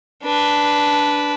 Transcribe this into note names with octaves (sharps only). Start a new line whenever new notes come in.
D4 B4